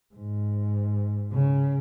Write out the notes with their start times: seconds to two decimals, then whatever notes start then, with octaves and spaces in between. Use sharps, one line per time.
0.14 G#2
1.32 C#3